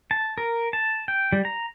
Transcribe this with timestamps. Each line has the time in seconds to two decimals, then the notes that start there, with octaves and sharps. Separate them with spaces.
0.11 A5
0.38 A#4
0.73 A5
1.08 G5
1.33 G3
1.45 A#5